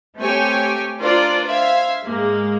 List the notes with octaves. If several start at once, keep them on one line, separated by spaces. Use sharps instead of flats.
A3 C4 G4 C#5 G5 G#5
D4 F4 A#4 C5 D5
C5 E5 F5 G#6
G#2 G#3 A#3